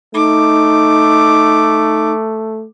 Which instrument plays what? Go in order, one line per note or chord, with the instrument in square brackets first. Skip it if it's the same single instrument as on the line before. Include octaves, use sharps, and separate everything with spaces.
[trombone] A3 [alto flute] D#4 [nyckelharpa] D6